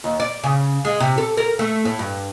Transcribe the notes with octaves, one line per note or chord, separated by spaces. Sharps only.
D#2
D5
C#3
G#3
C3
A4
A#4
A3
A2
G2